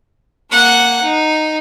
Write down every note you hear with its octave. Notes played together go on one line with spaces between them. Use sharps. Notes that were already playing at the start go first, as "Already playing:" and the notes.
A#3 F#5
D#4